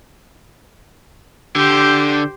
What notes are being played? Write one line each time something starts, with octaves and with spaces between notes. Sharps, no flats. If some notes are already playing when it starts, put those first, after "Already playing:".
D3 G4 C5